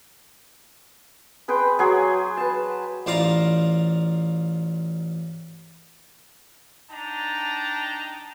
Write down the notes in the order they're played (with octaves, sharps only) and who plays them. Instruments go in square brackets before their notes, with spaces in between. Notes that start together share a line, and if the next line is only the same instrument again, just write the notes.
[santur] G#4 B4 G5 C6
F#3 G#4 C6
B4 A5
[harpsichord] A1 F4 C5 D5 F5 A#5
[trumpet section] D4 D#4 G5 A5 A#5